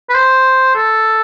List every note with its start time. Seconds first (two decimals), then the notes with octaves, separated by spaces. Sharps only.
0.09 B4
0.14 C5
0.75 A4